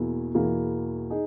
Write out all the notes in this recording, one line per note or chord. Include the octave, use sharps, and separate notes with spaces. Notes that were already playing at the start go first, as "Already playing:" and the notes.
Already playing: E2 B2 A#3 E4 G#4
E2 B2 A#3 E4 G#4
D#4 G#4